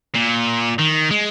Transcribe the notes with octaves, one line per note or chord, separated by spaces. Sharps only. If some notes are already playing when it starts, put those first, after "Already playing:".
A#2
D#3
G#3